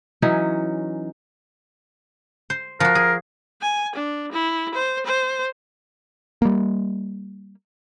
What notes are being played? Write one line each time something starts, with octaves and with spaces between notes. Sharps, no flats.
E3 F#3 C#4 D#4
C5
F3 F#4 A#4
G#4
G#5
D4
E4
C5
C5
G3 A#3